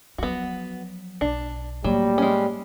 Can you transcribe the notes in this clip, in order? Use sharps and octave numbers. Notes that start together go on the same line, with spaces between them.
F3 F#3 B3 F#4
B1 D4
A2 F#3 G3 A#3
G#3 C#4